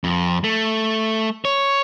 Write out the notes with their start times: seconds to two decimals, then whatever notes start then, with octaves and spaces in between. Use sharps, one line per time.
0.04 F2
0.44 A3
1.45 C#5